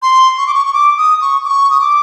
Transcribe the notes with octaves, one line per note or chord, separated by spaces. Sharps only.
C6
C#6
D6
C#6
C#6
D6
D#6
C#6
D6
C#6
D#6
D6